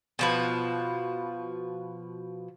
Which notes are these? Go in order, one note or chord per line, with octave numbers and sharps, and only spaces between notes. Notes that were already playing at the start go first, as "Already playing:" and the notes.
B2 F3 B4